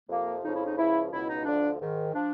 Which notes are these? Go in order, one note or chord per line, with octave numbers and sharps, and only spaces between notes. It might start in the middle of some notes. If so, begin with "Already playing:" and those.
F2 C3 F3 A#3
F2 C#3 F3 D#4
E4
D#4
C#2 C#3 F3 E4
C#2 B2 E4
D#4
D2 D3 F3 D4
G#2 D#3
F3 D4